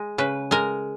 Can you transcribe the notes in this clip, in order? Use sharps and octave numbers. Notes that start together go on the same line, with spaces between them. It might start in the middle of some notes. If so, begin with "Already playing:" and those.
Already playing: G#3
C#3 B4
G#3 A#4